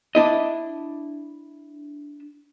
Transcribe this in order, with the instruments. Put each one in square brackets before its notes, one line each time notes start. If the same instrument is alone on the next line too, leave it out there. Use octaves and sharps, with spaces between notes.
[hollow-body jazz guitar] D4 E4 D#5